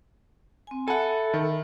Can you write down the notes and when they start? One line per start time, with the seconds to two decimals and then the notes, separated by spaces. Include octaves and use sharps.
0.67 C4 G#5
0.88 A4 E5 F#5 G#5 B5
1.34 D#3